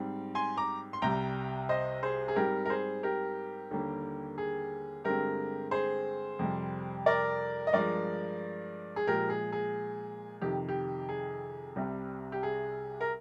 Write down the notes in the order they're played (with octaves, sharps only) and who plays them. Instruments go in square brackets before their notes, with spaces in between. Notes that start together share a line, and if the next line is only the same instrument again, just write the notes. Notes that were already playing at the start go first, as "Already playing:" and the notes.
Already playing: [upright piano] G#2 G3 C4
G#5 C6
A#5 D6
C6
C2 C3 G3 G5 A#5
C5 D#5
G#4 C5
G#4
G#2 G3 C4 G4 A#4
A#4
G#4 C5
G4 A#4
D#2 D3 G3 A#3
G#4
G2 D3 G#3 C4 G4 A#4
G#4 C5
F2 C3 G3
A#4 D5
D#5
G2 F3 G#3 A#4 D5
G#4
A#2 F3 G#3 G4 A#4
G#4
G#4
F2 C3 D#3 G4
G4
G#4
C2 C3 G3 C4
G4
G#4
A#4